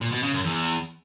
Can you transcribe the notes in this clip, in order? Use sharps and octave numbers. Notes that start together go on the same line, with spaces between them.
A#2
B2
C#3
F#2
E2